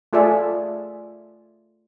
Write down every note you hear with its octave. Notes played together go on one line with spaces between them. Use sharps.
A3 F4 G#4 A4 D5 E5